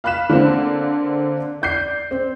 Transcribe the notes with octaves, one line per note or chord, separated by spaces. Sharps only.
F5 B5 F#6 B6 E7
D3 A#3 C4
D5 G6 C7
C4